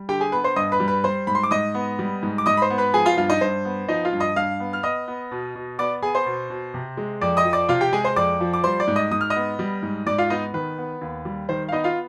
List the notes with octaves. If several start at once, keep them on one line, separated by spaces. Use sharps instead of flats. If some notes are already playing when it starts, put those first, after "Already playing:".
Already playing: G3
D3 G4 G5
G#4 G#5
B3 B4 B5
C5 C6
G2 D#5 D#6
B4 B5
G3
B4 B5
G3 C5 C6
G#2 B5
C6
D6
G#2 D#5 D#6
B3
G3
G#2
D6
G#2 D#5 D#6
B5
C5 C6
B3
B4 B5
F3 G#4 G#5
F4 F5
G2 F4 F5
D#4 D#5
G2 C5
B3
F3 D#4 D#5
F4 F5
G2
D#5 D#6
G2 F5 F6
B3
F6
B3 D#5 D#6
B3
B2
B2
B3 D5 D6
B3 G#4 G#5
C5 C6
B2
B2
C3
G#3
F2 D5 D6
D#5 D#6
F3
D5 D6
C3 F4 F5
G4 G5
G#3 G#4 G#5
C5 C6
F2 D5 D6
F3
D6
G3 C5 C6
D5 D6
G#2
D#5 D#6
G#2 D#6
F6
D#5 D#6
B3
G3
G#2
G#2 D5 D6
F4 F5
B3 D#4 D#5
D#3 B4
B3
D#2
G3
D#3 C5
F5
B3 D#4 D#5
F4 F5